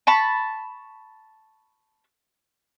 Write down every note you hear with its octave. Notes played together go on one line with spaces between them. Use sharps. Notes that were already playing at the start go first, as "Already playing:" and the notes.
A5 B5 C#6